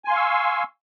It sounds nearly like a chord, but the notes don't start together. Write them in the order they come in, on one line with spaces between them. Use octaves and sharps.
G#5 C6 F5 C#6 E6